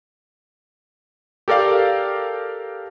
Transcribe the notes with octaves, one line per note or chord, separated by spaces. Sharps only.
G4 A4 A#4 D5 F5